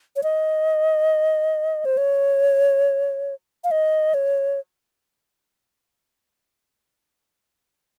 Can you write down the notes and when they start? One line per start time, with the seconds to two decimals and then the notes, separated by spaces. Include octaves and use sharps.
0.16 C#5
0.23 D#5
1.85 C5
1.97 C#5
3.64 F5
3.71 D#5
4.14 C#5